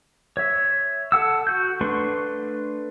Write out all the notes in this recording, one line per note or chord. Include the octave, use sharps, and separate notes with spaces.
C#5 E5
A4 F#5 E6
F#4 G6
A3 D4 B4 C6 C#6